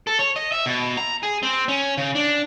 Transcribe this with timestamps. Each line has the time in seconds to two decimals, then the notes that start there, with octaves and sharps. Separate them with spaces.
0.07 A4
0.19 C#5
0.36 D#5
0.52 E5
0.66 B2
0.97 A#5
1.23 G#4
1.43 C4
1.68 C#4
1.97 C#3
2.15 D4